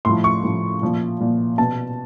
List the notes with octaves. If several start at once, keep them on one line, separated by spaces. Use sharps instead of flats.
A2 F3 C6
C#6
A2 F3
A#2 F3
A#2 F3
B2 A5